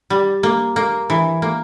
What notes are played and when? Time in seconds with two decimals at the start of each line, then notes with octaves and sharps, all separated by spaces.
0.10 G3
0.43 A#3
0.76 A#3
1.10 E3
1.42 A#3